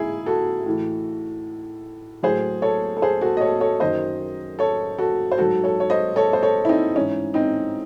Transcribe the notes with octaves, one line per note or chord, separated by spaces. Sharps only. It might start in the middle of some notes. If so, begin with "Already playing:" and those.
Already playing: G#2 E3 E4 G#4
F#4 A4
A2 E3
A2 F#3 G#4 C5
A4 C#5
A4
G#4 C5
F#4 A4
D#5
A4 C#5
A4 C#5
F#2 D#3 F#3 C5 D#5
A4 C#5
F#4 A4
C5
G#2 F#3 F#4 A4
A4 C#5
C#5
C5 D#5
A4 C#5
C5
A4 C#5
E4
C4 D#4
G#2 E3 C#4
C4 D#4